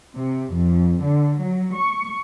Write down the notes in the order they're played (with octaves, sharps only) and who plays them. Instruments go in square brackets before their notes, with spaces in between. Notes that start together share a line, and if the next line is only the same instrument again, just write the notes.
[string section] C3
F2
D3
F#3
C#6